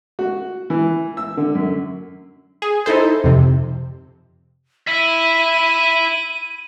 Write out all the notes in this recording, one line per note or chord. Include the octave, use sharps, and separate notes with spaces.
F#4
E3
E6
D3
F#2
G#4
D#4 E4 A4 C5
F2 C3
E4 E5 D#7